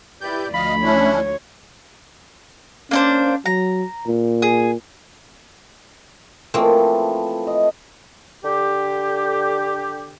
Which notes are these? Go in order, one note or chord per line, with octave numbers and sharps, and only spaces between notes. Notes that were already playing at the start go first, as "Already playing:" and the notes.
E4 G4 B4 D5 G6
D2 F3 D#5 F5 B5
C#4 D4 E4 C#5
A#3 C#4 D4 C5
F#3 A#5
A#2
G#4
E3 F3 A3 A#3 C4
D#5
D3 G4